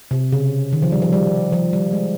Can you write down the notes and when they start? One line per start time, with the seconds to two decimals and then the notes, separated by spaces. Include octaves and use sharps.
0.11 C3
0.32 C#3
0.73 D#3
0.82 F3
0.92 G3
1.02 F3
1.13 G3
1.52 F3
1.73 G3
1.93 G#3